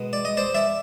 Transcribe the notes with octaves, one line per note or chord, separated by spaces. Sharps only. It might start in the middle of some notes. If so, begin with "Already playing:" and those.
Already playing: B2 G#3 B3
D5
D#5
C5 D5
D5 E5